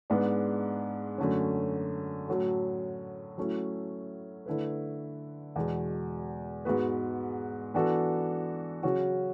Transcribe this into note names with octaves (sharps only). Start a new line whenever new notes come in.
G#2 G#3 B3 D4
F#2 D3 A3 C#4
A2 F#3 C#4 F#4 A4
F#3 A3 C#4 E4
D3 A3 E4 B4
E2 B2 G#3
G#2 G#3 B3 F#4 B4
E3 B3 D4 F#4 A4
C#3 F#3 C#4 F#4